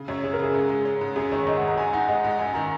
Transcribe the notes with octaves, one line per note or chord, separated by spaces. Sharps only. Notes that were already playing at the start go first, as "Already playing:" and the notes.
Already playing: C#3
F#2 C#5
C#4 G#4
A#4
C#3 G#4
G#2
G#3
C#4
G#2
F#2 G#4
D#3 C#5
G#1 D#5
F#5
G#1
A#5
G#2 G#5
D#4 F#5
G#3 D#5
G#2 F#5
F#2 G#5
D#3 A#5